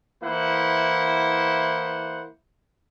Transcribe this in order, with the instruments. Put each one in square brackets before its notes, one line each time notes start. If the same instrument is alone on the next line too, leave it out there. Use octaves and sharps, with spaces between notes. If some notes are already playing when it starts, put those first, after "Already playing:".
[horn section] E3 A#3 E4 C5 F#5